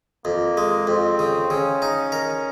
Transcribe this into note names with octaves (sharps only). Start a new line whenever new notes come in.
F2 A#3
G#3
F2 C4
C#3
C#3 C#4
D#4
A#4